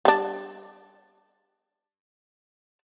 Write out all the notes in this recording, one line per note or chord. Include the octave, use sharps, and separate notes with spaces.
G3 D4